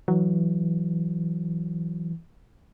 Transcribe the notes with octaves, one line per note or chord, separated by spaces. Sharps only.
E3 F#3